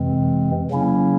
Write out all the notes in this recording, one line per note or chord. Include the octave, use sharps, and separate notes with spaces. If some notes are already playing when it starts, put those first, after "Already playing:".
Already playing: F2 C3 E3 G#3 C4
C#3 F#3 A#3 C#4 E4